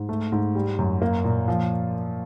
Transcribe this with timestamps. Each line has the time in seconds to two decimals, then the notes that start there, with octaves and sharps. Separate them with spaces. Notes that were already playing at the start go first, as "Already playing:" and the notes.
Already playing: G#2
0.09 A3
0.32 G#2
0.55 G3
0.79 F#2
1.02 A#3
1.24 A#2
1.48 F3